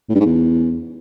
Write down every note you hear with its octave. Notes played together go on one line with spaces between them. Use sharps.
A2
G2
G#2
E2